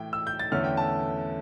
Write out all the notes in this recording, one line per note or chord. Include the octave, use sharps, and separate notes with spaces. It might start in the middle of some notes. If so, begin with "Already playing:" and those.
Already playing: A2 E3 G5
E6
G6
A6
E2 D3 A3 C#4 F6
G5
A5